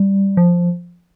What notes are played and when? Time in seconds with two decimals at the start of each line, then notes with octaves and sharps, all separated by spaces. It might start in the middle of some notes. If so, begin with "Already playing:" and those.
Already playing: G3
0.37 F3